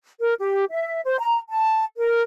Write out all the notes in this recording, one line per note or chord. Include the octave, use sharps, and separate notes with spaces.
A#4
G4
E5
C5
A#5
A5
A#4